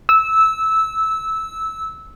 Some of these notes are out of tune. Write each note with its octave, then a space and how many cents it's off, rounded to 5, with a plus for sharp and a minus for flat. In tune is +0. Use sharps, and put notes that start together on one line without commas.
E6 -15